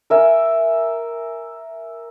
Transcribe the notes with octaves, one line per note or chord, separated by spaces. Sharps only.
A#4 E5 G#5